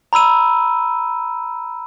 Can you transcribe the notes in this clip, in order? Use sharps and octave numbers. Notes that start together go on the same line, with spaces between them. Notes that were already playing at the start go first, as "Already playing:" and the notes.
A#5 B5 E6 D#7